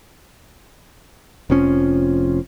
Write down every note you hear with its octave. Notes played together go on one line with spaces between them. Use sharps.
F1 F2 F3 C#4